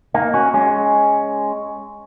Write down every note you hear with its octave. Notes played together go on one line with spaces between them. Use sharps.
A#3 D#4
C#4 F#4
G#3 C#4